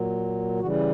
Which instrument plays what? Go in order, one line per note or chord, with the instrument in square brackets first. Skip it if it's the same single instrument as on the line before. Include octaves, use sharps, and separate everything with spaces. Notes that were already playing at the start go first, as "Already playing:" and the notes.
Already playing: [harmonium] A#2 F#3
C#3 E3 G3 F#4